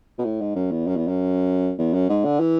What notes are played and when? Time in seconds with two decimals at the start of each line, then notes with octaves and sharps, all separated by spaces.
0.18 B2
0.25 A2
0.41 G#2
0.55 F#2
0.71 E2
0.87 F#2
0.96 E2
1.07 F#2
1.78 E2
1.93 F#2
2.09 G#2
2.24 D3
2.40 E3